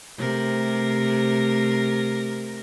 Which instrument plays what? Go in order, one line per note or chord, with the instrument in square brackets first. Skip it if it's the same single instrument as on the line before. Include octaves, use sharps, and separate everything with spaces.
[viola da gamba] C3 A3 A#4